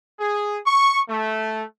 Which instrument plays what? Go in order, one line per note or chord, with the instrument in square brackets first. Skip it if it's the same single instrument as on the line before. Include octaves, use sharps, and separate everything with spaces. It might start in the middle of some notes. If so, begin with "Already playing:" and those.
[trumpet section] G#4
C#6
A3